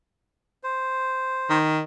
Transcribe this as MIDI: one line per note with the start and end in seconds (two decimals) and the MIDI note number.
0.63 1.59 72
1.50 1.81 51